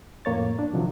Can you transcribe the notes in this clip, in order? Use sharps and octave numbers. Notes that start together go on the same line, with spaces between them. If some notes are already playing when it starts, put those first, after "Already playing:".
F2 A2 A#3 C#5 A6
D4
C3 D#3 F3 F#3